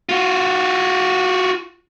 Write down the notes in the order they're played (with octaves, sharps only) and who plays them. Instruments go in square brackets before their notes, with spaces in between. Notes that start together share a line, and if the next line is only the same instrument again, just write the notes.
[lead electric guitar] F4 F#4